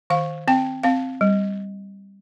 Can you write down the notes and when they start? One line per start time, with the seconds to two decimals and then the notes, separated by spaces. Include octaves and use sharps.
0.10 D#3 F5
0.48 C4 G5
0.83 C4 F5
1.21 G3